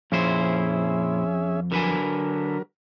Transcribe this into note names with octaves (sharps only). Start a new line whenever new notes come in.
F2 A#2 C#4 E4 G#4 C5 E5
D3 F#3 A#4 B4 G#5